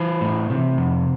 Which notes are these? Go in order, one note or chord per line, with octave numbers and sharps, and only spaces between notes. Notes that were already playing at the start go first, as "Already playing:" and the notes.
Already playing: E3 C5
A2
C3
F2